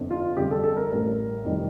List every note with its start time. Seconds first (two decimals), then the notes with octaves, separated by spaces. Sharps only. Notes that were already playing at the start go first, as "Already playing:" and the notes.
Already playing: G1 F2 D3
0.11 F4
0.37 G1 F2 D3 G3 G4
0.51 A4
0.64 A4
0.77 A#4
0.90 A1 A2 G3 A#4
1.44 F1 F2 D#3 G3